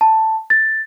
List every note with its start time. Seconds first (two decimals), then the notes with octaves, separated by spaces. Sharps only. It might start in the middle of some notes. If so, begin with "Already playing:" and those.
0.01 A5
0.50 A6